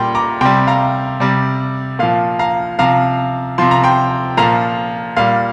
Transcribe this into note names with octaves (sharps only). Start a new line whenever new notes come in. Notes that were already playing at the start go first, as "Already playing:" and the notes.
Already playing: A#2 G3 G5 C6
A#5 D6
C3 G3 G5 C6
F5 A#5
C3 G3 D5
A#2 F3 F5
F5 A#5
C3 F3 F5 A#5
C3 F3 C6
A#5
G5 C6
A#2 F3 F5 A#5
A#2 G3 F5